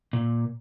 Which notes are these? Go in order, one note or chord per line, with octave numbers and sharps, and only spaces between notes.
A#2